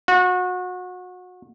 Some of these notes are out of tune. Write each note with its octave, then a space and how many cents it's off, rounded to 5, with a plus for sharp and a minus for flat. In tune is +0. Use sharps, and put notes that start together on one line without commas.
F#4 -30